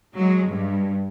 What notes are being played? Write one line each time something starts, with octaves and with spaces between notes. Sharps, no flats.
F#3 G#3
G2